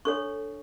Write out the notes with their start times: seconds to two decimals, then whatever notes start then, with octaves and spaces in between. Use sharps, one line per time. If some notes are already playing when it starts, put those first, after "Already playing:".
0.05 D4 A4 C#5 C#6